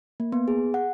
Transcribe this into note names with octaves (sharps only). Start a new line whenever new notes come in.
A#3
B3
G#4
F#5